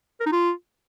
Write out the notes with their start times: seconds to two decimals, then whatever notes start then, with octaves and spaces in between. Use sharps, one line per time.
0.20 A#4
0.26 D#4
0.32 F4